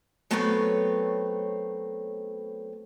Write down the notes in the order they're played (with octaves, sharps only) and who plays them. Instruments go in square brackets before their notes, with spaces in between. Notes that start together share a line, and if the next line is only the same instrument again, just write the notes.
[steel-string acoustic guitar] F#3 A3 B3 C4 B4 C#5